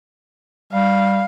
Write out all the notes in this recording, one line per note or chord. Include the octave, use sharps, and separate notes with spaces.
G3 F5